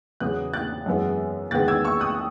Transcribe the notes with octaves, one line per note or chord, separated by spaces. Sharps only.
E2 C#3 F#3 B3 D#6 F#6
F#6 A6
F#2 E3 G#3 B3
E2 D#3 G#3 B3 F#6 A6
E6 G#6
C#6 E6
D#6 F#6